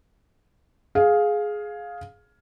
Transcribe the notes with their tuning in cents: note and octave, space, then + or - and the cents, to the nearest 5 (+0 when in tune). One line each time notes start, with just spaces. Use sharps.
G#4 +10 F5 +10